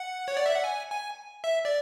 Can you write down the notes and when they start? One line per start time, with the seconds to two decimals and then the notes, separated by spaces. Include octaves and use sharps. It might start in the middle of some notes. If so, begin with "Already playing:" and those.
Already playing: F#5
0.28 C#5
0.37 D5
0.46 E5
0.54 F#5
0.64 G#5
0.91 G#5
1.44 E5
1.65 D5